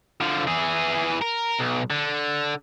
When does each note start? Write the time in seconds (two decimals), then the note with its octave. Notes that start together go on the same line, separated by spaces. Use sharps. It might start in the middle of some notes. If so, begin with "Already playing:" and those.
0.21 D3 F3
0.47 E3 G#4
1.21 A#4
1.59 B1
1.90 D3